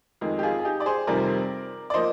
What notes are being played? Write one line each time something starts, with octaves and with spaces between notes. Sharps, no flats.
F2 D#3 G#3
G4
F4 G#4
G#4
D#4 G4
D5
G#4 C5
F2 C3 D#3 G3 C4 A#4 D5
D5
F3 A#3 C5 D#5